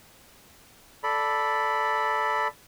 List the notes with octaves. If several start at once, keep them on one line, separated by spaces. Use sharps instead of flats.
A4 D5 B5